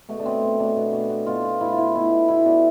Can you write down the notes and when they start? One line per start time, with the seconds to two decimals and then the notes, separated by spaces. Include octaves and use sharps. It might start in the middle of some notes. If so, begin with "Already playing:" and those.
0.09 B2 A3
0.19 D4
0.25 B2 C4
0.43 B2
0.59 B2 D4
0.76 B2
0.93 B2
1.10 B2
1.26 B2 F4
1.44 B2
1.61 B2 E4
1.73 F4
1.78 B2 E4
1.95 B2 E4
2.11 B2
2.28 B2 E4
2.46 B2 D4